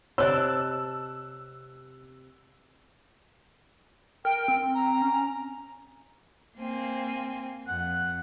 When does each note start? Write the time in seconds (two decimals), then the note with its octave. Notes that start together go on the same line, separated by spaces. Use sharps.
0.18 C3 C#5 D#5 A5 D6 E6 F#6
4.25 A#4 G5
4.48 C4
4.75 A#5
5.02 C#4
6.57 A#3 C4 G#5
7.68 F2 F#5